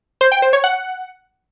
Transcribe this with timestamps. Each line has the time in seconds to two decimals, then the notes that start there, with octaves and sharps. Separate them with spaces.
0.21 C5
0.32 G5
0.42 C5
0.53 C#5
0.64 F#5